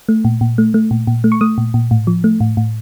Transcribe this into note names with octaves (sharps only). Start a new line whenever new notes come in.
A3
A#2
A#2
A3
A3
A#2
A#2
A3
C#6
A3 D#6
A#2
A#2
A2
F3
A3
A2
A2